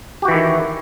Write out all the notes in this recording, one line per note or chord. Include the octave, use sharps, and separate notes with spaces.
D#3 E3 E4 F#4 G4